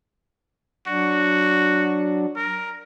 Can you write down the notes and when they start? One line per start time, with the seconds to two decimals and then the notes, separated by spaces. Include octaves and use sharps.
0.88 F#3 D4 F#4
2.36 A#4